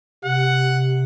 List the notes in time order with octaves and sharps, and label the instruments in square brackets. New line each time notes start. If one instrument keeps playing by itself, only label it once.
[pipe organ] C3 [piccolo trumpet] F#5